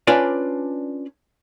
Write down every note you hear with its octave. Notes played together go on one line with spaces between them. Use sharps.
C#4 D4 F4 B4 D5